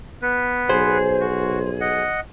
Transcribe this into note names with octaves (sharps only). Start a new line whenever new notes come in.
B3 B4
B1 G#4 C5
F#4
D#5 F#5